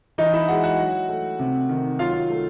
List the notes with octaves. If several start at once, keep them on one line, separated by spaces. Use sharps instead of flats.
E3 D#4 D#5
E4 E5
G#3 F#4 F#5
F#4 F#5
F#3
A3
C3
D#3
F#3 F4 F5
A3